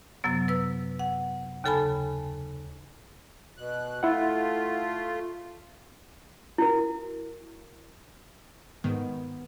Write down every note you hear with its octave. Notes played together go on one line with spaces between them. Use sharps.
F#2 C3 F#3 B3
B4 E6
F#5
D#2 C#3 A4 G#5 A5 B5
B2 F#6
A3 E4 F4 F#5
E4 F#4 A#4
G#2 D#3 B3